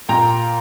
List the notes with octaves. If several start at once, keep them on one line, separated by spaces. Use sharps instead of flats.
A#2 G5 A#5